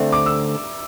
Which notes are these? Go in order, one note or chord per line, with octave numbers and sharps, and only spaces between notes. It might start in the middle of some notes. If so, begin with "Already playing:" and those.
Already playing: D3 A3 C4 D5 E5
D6
E6